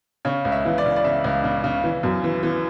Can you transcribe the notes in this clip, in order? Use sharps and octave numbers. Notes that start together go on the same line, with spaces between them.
C#3 C#5
C#2
E5
E3
D5
C#3
D5
C#3 E5
C#2
C#3
C#3
E3
F#2
E3
E3